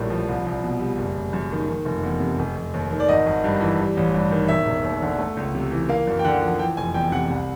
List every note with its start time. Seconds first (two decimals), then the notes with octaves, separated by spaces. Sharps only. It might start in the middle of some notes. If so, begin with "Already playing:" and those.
Already playing: A#1 A2 G3 A#3
0.10 F3
0.29 C2
0.46 C2
0.64 B2
0.80 G3
0.98 F#1
1.16 F#1
1.33 F#2
1.52 D#3
1.69 D#3
1.85 F1
2.03 E2
2.21 C3
2.39 F1
2.56 F1
2.74 D#2
2.91 D#3
3.00 D5
3.09 G#1 D#5
3.26 G#1
3.44 G2
3.61 E3
3.79 G3
3.97 A1
4.14 G2
4.31 D#3
4.48 E1 E5
4.66 E1
4.84 D#2
5.02 D3
5.19 A3
5.37 C#2
5.55 C3
5.71 E3
5.89 A#3 F5
6.07 F#2
6.19 G5
6.25 D3 F#5
6.41 F3
6.59 E3 G5
6.77 F1 G#5
6.94 E2 G5
7.12 C3 F#5
7.30 C2